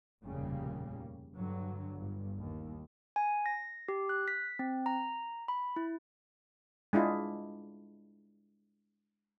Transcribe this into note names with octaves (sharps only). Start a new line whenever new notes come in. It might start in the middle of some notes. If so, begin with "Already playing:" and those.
F1 D#2 A#2 C#3 G3 A#3
G2 D3 F#3
G1 G2
D#2
G#5
A#6
G4
F#6
B6
C4
A#5
B5
E4
G#3 D4 E4 F4